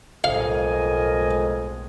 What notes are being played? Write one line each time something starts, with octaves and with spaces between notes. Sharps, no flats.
B1 F2 A2 G#3 A#4 D#5 F5 G#5